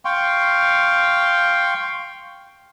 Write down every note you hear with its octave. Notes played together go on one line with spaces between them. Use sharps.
F5 G5 C6 C#6